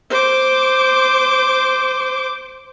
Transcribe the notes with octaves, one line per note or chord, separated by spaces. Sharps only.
C5 D6